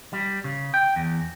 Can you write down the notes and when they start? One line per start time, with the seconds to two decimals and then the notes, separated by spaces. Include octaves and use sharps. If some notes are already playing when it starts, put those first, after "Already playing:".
0.13 G3
0.44 C#3
0.74 G5
0.96 E2